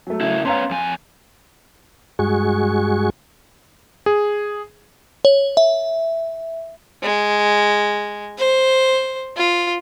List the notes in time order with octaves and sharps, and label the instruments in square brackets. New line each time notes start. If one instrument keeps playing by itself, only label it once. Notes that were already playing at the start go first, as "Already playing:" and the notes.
[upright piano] F#3 A3
[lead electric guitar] C#3 E4
[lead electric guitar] B3 C#4 [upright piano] F5 A#5 C6
[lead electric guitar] F2 G#5
[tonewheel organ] G2 G#3 F#4 G#4 C#6
[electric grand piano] G#4
[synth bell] C#5
E5
[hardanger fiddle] G#3
C5
F4